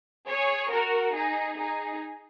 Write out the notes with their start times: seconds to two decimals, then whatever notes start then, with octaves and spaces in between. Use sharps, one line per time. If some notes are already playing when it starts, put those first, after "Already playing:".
0.29 G#4 C#5
0.72 F#4 A#4
1.15 D#4 G#4
1.59 D#4 G#4